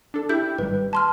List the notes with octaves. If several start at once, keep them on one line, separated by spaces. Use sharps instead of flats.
D4 A4
E4 G4 G6
G#1 G3 B4
A5 C6 F6